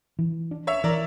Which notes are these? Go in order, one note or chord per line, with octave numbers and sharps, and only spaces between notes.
E3
D4
C#5 E5
E3 A#4 D5